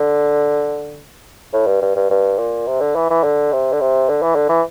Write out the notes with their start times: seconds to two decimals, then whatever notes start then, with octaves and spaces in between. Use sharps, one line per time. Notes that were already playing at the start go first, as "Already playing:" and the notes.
Already playing: D3
1.53 A2
1.67 G2
1.82 G2
1.96 G2
2.10 G2
2.39 A#2
2.67 C3
2.81 D3
2.95 E3
3.10 E3
3.24 D3
3.53 C3
3.73 D3
3.81 C3
4.09 D3
4.22 E3
4.36 D3
4.49 E3